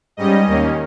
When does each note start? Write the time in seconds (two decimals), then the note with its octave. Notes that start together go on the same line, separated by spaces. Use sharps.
0.17 G#2 G3 C#4 D#5
0.47 D#2 D#3 A#3 C#4